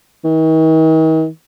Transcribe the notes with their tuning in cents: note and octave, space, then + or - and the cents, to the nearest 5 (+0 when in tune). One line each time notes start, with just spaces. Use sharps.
D#3 +45